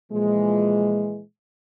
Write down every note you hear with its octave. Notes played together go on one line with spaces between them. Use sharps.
A#2 E3 F3 G#3